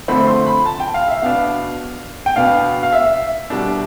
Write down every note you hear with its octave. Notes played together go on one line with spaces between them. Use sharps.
D3 F3 A3 C4 B5
C6
B5
A5
G5
F5
E5
B2 B3 D4 F5
G5
B2 B3 D4 F5
F5
E5
B2 G3 D4